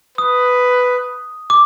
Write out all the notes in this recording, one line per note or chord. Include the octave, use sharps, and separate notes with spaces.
B4 D#6
D6